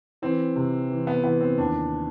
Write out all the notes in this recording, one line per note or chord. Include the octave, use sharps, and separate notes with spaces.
E3 C4
C3
E3
B3
E3 B3
C4
D#2 D4